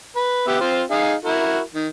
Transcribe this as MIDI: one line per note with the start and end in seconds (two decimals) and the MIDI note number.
0.16 0.47 71
0.47 0.58 59
0.47 0.58 67
0.47 0.58 76
0.61 0.82 60
0.61 0.82 65
0.61 0.82 72
0.91 1.13 63
0.91 1.13 68
0.91 1.13 77
1.25 1.59 64
1.25 1.59 66
1.25 1.59 70
1.74 1.87 51